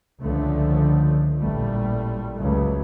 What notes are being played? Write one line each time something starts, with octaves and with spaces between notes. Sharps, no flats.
C#2 D3 F3 A3
A1 A#2 G3 A3
C#2 F#2 F#3 A3